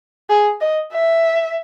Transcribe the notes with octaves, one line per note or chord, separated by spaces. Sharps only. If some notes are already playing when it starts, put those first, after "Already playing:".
G#4
D#5
E5